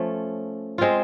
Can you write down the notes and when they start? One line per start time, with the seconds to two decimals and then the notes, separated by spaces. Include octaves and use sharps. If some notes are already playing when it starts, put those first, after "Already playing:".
Already playing: F3 A3 C#4
0.78 G#3 C4 F4